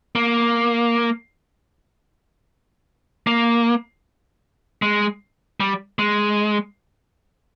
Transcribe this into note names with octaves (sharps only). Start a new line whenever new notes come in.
A#3
A#3
G#3
G3
G#3